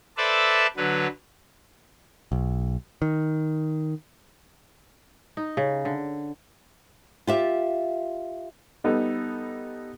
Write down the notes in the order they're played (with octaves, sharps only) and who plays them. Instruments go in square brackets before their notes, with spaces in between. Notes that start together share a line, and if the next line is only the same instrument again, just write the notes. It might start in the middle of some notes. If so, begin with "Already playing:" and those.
[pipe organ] A4 B4 C5 D5 E5 A5
D3 F#3 B4
[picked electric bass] B1
D#3
[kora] D#4
C#3
D3
[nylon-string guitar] F4 G4 E5
[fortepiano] G3 B3 D#4 A4